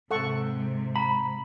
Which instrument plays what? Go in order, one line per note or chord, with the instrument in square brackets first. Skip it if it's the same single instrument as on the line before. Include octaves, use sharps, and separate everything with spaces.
[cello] G#2 C3 [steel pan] A4 F#5 C#6
[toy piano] A#5 [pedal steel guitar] B5